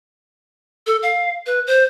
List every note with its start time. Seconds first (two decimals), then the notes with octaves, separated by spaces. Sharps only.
0.87 A4
1.03 F5
1.46 B4
1.67 C5